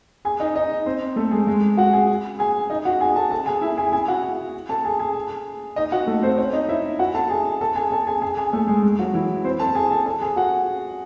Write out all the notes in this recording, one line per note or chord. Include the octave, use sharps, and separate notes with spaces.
G#4 G#5
D#4 D#5
D#4 D#5
C4 C5
A3 A4
G#3 G#4
G#3 G#4
F#4 F#5
G#4 G#5
G#4 G#5
D#4 D#5
F#4 F#5
G#4 G#5
A4 A5
A4 A5
G#4 G#5
E4 E5
G#4 G#5
G#4 G#5
F#4 F#5
A4 A5
G#4 G#5
G#4 G#5
D#4 D#5
F#4 F#5
A3 A4
C4 C5
C#4 C#5
D#4 D#5
E4 E5
F#4 F#5
A4 A5
G#4 G#5
A4 A5
G#4 G#5
A4 A5
G#4 G#5
G#4 G#5
G#4 G#5
A3 A4
G#3 G#4
G#3 G#4
F#3 F#4
E3 E4
C4 C5
A4 A5
G#4 G#5
A4 A5
A4 A5
G#4 G#5
F#4 F#5